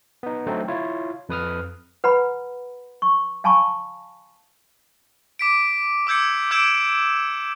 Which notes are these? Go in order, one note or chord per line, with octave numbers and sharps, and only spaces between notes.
B3 D#4
D3 F#3 A3 C4 D#4
E4 F4 C#5
F2 B4 D#6 F6
B4 F#5 A#5 B5
C#6
F5 G#5 A5 B5 C#6
D6 B6 D7
D6 E6 G6 G#6 C#7
D6 E6 G6 G#6 D7 E7